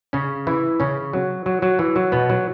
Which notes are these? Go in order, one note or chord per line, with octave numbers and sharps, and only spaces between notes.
C#3 C#4
E3 E4
C#3 C#4
F#3
F#3
F#3
E3
F#3
B2 B3
F#3